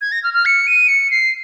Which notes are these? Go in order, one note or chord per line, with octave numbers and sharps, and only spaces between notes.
G#6
A#6
F6
F6
C#7
D#7
C#7
C7